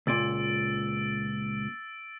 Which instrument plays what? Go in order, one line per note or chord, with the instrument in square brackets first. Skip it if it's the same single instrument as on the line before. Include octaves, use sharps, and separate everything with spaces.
[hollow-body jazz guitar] C#2 A#2 [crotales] E6 A6 D7